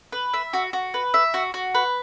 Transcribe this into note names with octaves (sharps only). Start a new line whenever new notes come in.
B4
E5
F#4
F#4
B4
E5
F#4
F#4
B4